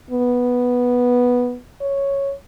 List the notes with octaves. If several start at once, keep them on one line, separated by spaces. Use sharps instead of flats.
B3
C#5